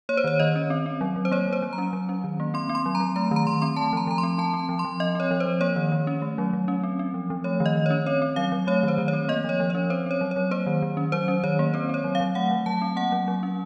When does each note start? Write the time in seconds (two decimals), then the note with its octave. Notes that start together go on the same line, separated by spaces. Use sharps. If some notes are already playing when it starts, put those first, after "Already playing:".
0.09 A#3 C#5
0.17 C5
0.24 D#3 C#5
0.39 D#3 D#5
0.56 C#4
0.70 C4
0.86 C4
1.01 F#3
1.16 F#3
1.25 C5
1.32 A#3 C#5
1.47 F#3
1.53 C5
1.62 F#3
1.73 A#5
1.78 C#4
1.93 F#3
2.09 C#4
2.24 D#3
2.40 A#3
2.54 C4 C6
2.69 C4
2.75 C6
2.86 F#3
2.95 A#5
3.00 F#3
3.16 A3 A#5
3.31 D#3
3.36 A#5
3.47 D#3 C6
3.62 C4 C6
3.76 A3 A5
3.93 F3 A#5
4.07 F3 A#5
4.18 C6
4.23 C4
4.38 C4 A5
4.53 C4
4.59 A5
4.69 F3
4.79 C6
4.85 F3
5.00 C4 D#5
5.15 C4 C#5
5.31 F3
5.40 C5
5.45 F3
5.61 A#3 C#5
5.76 D#3
5.92 D#3
6.07 C#4
6.22 A3
6.38 F#3
6.53 F#3
6.68 C#4
6.83 C4
6.99 C4
7.14 F3
7.30 F3
7.44 A3 C#5
7.60 D#3
7.66 D#5
7.76 D#3
7.86 C#4 C#5
8.06 C4 C#5
8.22 C4
8.36 F#3 F5
8.52 F#3
8.67 A3 C#5
8.83 D#3
8.88 C5
8.98 D#3
9.08 C#5
9.13 C4
9.29 A#3 D#5
9.44 F3 C#5
9.60 F3
9.70 C#4 C#5
9.90 C4 C5
10.06 C4 C#5
10.21 F#3
10.31 F#3 C#5
10.51 A#3 C5
10.66 D#3
10.82 D#3
10.97 C#4
11.12 F#3 C5
11.28 C#4
11.43 D#3 C#5
11.59 A#3
11.74 C4 C5
11.89 C4 C#5
12.04 F#3
12.15 F5
12.20 F#3
12.35 A3 F#5
12.51 F#3
12.66 F#3 A5
12.82 C4
12.96 A#3 F#5
13.12 F#3
13.28 F#3
13.43 C#4